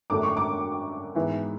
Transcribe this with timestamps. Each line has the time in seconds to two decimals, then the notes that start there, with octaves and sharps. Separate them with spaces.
0.10 F#2 D3 A3 D4 D6
0.23 C#6
0.37 D6
1.15 G#2 E3 B3 E4